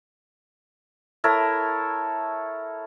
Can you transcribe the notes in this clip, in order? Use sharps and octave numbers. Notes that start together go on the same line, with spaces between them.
E4 A4 A#4 C#5